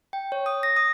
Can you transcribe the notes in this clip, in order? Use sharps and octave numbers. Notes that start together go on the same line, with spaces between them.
G5
C#5
D#6
A#6
D#6